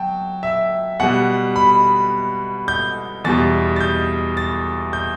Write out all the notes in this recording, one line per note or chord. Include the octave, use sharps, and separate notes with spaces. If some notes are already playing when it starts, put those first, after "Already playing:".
Already playing: F#3 G5 A5
E5
B2 G3 F#5
B5
G6
E2 B2 G3 A6
A6
G6
A6
G6